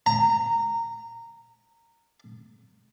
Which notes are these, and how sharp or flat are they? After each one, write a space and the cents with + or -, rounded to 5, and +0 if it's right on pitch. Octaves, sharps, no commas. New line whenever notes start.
A#5 -15